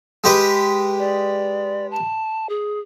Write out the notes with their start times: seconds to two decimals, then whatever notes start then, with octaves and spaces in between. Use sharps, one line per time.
0.24 G#3 G4 B4
0.99 D5
1.91 A5
2.49 G#4